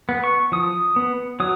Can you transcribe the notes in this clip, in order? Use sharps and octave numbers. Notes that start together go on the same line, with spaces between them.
B3
C#6
F3 D#6
B3
F#3 D#6